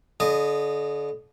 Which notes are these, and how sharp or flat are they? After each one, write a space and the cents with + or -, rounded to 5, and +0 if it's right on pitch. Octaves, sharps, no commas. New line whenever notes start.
D3 -40 D#5 -20 D#6 +0